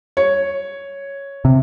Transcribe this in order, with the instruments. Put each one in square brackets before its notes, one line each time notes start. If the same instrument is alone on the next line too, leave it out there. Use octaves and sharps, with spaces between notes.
[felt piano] C#5
[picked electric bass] C3